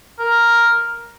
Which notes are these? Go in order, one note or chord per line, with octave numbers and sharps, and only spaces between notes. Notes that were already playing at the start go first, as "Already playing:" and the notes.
A#4